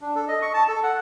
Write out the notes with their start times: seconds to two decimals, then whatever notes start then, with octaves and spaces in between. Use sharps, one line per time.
0.01 D4
0.16 A4
0.28 D#5
0.42 C#6
0.54 A5
0.68 A4
0.83 F#5